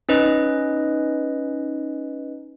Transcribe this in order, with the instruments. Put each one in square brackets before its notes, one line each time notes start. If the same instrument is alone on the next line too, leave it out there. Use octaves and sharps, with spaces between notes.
[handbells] C#4 D#4 B4 D#5